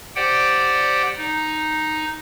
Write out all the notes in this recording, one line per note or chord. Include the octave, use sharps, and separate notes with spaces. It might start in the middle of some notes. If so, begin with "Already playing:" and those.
G4 C5 D5 F#5 G5
D#4